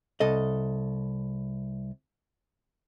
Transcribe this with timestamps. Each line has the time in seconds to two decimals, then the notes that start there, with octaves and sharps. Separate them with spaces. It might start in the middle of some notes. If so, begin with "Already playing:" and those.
0.20 C2 A4 D#5